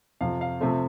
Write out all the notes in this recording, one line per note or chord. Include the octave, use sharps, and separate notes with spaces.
F2 C3 F3 F5
F5
C3 F3 A3 C4 E5